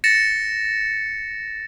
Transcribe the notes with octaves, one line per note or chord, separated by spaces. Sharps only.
A6 A#6 C#7 E7